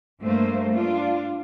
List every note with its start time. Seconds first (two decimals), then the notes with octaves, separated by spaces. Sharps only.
0.22 G2 A3 A#3 C5
0.73 D4 F4